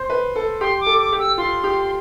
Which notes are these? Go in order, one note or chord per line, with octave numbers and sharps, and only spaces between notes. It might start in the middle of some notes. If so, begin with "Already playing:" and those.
Already playing: C5
B4
A4
G4 C6
D6
A4
D6
G4
E6
F4 C6
G4